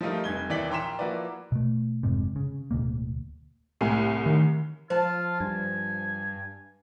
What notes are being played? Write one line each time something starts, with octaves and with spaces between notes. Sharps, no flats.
F3 G3 A3 D#4 F4 A#4
F1 G2 G#6 G7
D#2 E3 D5 G5 B6 F#7
A#1 G5 A#5 C6 B6 E7
F3 A#3 E4 F#4 B4 D5
B2 A3
F1 G#2 C3
C#3
D1 D2 B2 A#3
C2 A2 G#5
D#3
F3 F4 C5 A5
G2 G#5